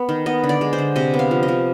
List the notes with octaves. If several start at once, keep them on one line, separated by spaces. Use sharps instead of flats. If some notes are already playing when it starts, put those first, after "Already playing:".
Already playing: B3
D#3
B3 D#5
D3
D5
G#3
C5
D3
C3 D#5
B3
F5
F3
D#5
F3